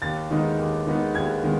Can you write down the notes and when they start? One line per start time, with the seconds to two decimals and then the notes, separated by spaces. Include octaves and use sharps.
0.02 D#2 A6
0.31 D#3 G#3 B3 D#4
0.58 D#2
0.87 D#3 G#3 B3 D#4
1.15 D#2 G#6
1.43 D#3 G#3 B3